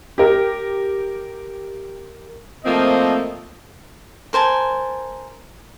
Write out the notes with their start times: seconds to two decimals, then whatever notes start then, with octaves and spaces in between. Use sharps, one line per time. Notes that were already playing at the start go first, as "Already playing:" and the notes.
0.18 G4 A#4
2.65 F3 A3 A#3 C4 D#5
4.33 A#4 C5 G#5 A5